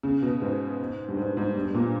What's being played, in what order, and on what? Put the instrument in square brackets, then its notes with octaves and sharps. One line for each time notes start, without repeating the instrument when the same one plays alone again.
[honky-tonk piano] C#3
B2
G#2
G2
G#2
G#2
G2
G2
A#2